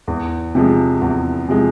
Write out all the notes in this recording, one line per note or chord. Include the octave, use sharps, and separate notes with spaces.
E2
C3 F3 G#3
E2
C3 F3 G#3